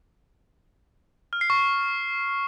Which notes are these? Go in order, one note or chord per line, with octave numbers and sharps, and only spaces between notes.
F6
C7
C#6